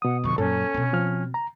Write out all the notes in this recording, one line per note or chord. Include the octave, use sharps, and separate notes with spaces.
B2 F#5 D#6
F2 D3 C#6
F#2 A#2 C#4 A4
B2 C4
F3 F6
A#5